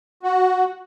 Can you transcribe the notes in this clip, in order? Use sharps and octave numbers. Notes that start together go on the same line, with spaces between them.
F#4